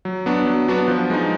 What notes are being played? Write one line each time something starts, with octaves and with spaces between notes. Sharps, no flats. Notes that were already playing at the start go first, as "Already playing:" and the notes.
F#3
B3 D4 F#4
F#3
B3 D4 F#4
F3
G#3 D#4